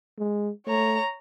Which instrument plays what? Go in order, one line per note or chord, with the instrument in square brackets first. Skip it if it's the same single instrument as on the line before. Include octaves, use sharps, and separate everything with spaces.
[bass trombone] G#3
[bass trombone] A3 [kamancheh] C#5 A#5